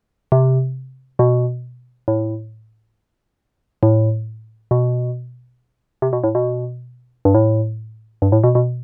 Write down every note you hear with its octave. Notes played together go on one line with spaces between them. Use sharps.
C3
B2
A2
A2
B2
C3
B2
A2
B2
G2
A2
G2
A2
B2
B2